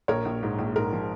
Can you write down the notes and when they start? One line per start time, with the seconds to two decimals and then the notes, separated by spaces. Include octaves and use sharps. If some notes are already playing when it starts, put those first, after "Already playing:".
0.08 A#1 A#4 C#5
0.25 A#1
0.43 G#2
0.59 A#1
0.76 G#2 A#4
0.93 F3